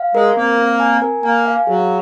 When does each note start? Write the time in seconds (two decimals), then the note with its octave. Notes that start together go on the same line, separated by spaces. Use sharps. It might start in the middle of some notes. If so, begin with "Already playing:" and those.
Already playing: F5
0.15 G#3 A#4
0.36 A#3 C4
0.58 C4
0.80 G#5
1.02 A#4
1.23 A#3 G#5
1.46 F5
1.67 F#3 G#4